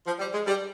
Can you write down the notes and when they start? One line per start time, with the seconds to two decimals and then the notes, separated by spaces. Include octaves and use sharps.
0.05 F3
0.19 G3
0.32 G#3
0.46 G3